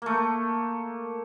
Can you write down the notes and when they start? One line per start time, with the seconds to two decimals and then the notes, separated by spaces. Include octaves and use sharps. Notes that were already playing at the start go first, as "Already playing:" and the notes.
0.02 A3 A#3